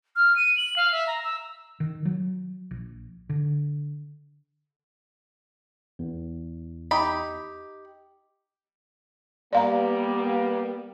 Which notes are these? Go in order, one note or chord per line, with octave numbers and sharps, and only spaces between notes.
F6
D#7
F#7
F5
E5
A#5
E6
D#3
F#3
A#1
D3
E2
D#4 G4 B5
G3 A#3 B3 D5 F5 A#5